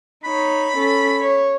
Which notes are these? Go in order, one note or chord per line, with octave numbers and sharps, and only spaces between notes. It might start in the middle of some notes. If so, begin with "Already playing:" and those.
D#4 C#5 B5
C#4 A4
C#5